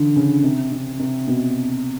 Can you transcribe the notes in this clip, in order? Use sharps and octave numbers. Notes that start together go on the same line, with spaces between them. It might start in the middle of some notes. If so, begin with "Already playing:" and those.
Already playing: D3 E3
C#3
C3
C3
C3
B2